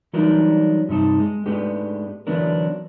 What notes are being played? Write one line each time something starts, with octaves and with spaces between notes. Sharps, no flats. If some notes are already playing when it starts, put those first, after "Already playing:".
E3 F#3 G3 D4 D#4 A#4
G2 C3 D#4 A5
G#3
G#2 G#3 A3 B3 D4 G4
D3 E3 F#3 B3 D4 A#4